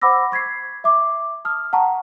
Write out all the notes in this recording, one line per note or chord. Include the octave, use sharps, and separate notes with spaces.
C5 F#5 B5 D6 E6 A#6
C#6 G#6 B6 C7
E5 D6
A5 D#6 F6
F#5 A5 A#5 C#6